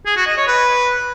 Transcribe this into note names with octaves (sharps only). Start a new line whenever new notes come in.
G#4
F#4
D#5
C#5
B4